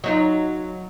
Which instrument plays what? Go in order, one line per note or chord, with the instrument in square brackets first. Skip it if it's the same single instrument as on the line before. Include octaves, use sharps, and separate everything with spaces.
[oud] F#3 D#4 F4